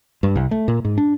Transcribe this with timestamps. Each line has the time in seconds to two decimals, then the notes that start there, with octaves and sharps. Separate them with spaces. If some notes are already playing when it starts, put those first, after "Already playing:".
0.23 G2
0.36 C2
0.51 A3
0.68 A#2
0.85 G#2
0.98 D4